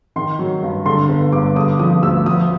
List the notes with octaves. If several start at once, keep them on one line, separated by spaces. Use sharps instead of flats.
D#3 C6
F#3
G2
D3 C6
G1
G2 D6
D3 D#6
F3 D#6
D2 E6
F3 D#6